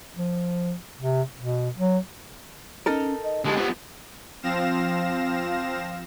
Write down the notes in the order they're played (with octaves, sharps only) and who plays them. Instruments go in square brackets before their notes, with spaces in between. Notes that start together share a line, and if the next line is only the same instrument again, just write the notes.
[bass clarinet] F3
C3
B2
F#3
[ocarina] C#4 [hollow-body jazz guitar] D#4 A4 A#4
[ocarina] D#5
[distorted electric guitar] D3 G#3 [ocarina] G4
[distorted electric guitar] F3 B3
[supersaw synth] F3 C4 F5 A#6 E7